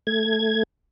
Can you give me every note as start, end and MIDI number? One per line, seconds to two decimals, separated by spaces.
0.07 0.63 57
0.07 0.63 92